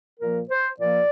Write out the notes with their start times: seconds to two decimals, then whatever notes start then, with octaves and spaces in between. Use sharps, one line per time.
0.19 A#2 F3 A#3 A#4
0.50 C5
0.80 A#2 F3 A#3 D5